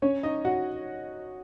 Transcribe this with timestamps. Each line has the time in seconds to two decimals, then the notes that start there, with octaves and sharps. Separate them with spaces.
0.02 C#4 C#5
0.23 D#4 D#5
0.45 F#4 F#5